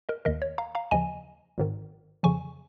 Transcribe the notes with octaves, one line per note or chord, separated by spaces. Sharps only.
A#4 D#5
D#2 D#3 A#4 D#5
C#5
F5 A#5
F5 A#5
D#2 C#3 F3 D#5 G#5
G#1 G#2 D#3
F2 C#3 F3 G#5 C#6